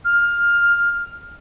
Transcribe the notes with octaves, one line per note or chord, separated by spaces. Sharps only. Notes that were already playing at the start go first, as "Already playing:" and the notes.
F6